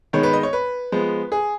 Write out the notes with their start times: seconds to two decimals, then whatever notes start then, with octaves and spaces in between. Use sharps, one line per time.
0.13 D#3 G#3 B3 C#5
0.23 B4
0.33 D#5
0.43 C#5
0.53 B4
0.92 F3 G#3 B3
1.32 G#4